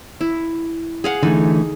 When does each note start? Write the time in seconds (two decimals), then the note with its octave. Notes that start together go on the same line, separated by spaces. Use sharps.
0.21 E4
1.04 G#4 F5 F#5
1.23 D3 E3 A3 D#4